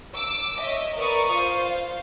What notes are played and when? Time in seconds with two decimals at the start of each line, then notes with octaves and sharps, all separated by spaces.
0.14 D6 E6
0.60 C#5 D#5 E5
0.96 A#4 B4 D5 C#6 D#6
1.32 F4 C5 F5